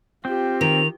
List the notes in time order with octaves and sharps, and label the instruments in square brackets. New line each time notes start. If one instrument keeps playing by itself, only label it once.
[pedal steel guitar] C4 [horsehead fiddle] F4 G4
[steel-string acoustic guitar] D#3 [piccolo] F7